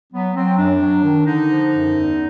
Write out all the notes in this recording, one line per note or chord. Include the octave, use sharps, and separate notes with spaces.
F#3 B3
F#3 C4
F#2 D4
F#3
D#3
D3 D#4
F3
F#2
E2